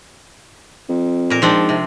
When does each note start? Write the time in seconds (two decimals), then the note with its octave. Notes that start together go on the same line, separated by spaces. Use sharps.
0.89 F2
1.30 A#2 A#4
1.42 G#2 F3 C4 D4
1.69 C3